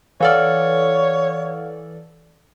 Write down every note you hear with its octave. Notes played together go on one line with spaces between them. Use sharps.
E3 A4 C#5 D5 F5 F#5 F6